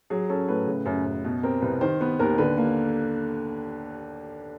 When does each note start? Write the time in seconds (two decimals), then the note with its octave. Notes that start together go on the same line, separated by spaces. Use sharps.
0.10 F#3 G#4
0.30 C#4 A4
0.48 A2 B4
0.67 C#3
0.86 F#2
1.05 F#2
1.24 B2
1.43 C4 A#4
1.62 C2 B4
1.81 D#3 C5
2.00 B3 B4
2.19 D#2 A#4
2.38 D3 B4
2.57 A#3